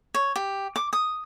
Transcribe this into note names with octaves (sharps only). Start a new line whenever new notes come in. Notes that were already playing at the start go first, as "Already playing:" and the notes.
C#5
G4
D6
D#6